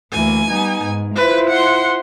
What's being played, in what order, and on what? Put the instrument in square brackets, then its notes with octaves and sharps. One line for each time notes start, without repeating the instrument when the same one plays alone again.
[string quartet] D2 E3 A#3 [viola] G#5
[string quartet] G3 B3 D#4
G#2
[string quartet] E4 F4 C5 [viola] B4
[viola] F#5 C6